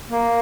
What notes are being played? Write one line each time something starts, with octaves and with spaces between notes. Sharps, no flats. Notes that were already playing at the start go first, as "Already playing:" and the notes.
A#3